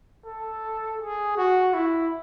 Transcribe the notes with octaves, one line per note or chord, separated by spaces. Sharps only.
A4
G#4
F#4
E4